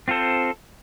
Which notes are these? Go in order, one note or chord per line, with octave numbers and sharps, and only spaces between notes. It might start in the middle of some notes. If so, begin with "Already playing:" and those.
C4 F4 A4 C5